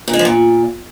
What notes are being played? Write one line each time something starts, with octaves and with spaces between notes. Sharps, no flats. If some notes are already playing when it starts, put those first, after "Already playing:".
A#2
G#3
F3
A#2